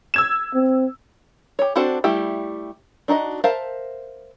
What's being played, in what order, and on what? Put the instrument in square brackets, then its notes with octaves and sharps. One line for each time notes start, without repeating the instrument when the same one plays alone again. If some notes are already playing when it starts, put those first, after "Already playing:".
[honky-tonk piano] E6 G#6 E7
[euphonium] C4
[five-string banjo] G4 C#5
C4 D4 F#4 A4 C5
G3 A3 E4 G4 G5
D4 D#4 F#4 D#5
A#4 C5 E5 F5 A5